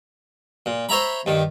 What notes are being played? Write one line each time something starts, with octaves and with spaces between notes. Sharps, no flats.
A#2
C5 C#5 E5 A#5 B5
G2 D#3